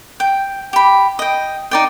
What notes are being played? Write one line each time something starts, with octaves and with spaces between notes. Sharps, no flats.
G5
G4 B5
D#5 G5
D#4 D5 G5